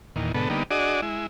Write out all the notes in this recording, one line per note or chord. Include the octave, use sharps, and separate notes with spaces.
E2 A#2 D#3
G#2 B2 D3 B3 A4
D3 G3 A#3 B3 D#4
D4 F#4 G#4 D5 D#5
G#3 E4